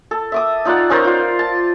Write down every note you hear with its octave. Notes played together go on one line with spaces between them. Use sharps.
A4
E5 D6 D#6
D#4 F4 D5 F#5
C#4 D#4 A#4 C5
F4 D5
A5